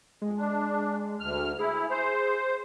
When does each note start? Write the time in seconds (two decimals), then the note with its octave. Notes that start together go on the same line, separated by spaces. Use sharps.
0.22 F2 G#3
0.38 D4
1.20 D2 F6
1.59 E4 G#4
1.91 C5